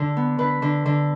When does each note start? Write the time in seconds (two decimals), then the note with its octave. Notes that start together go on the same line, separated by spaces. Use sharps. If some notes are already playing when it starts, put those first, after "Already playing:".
Already playing: D3
0.17 B3
0.38 D3 B4
0.62 D3
0.86 D3